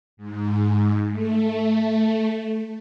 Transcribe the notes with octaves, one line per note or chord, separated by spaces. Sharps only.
G#2
A3